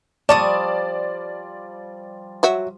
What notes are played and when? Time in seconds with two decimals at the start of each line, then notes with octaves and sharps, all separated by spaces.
0.29 F3 G3 D5 A5 C#6 D#6
2.43 F#3 F#4 E5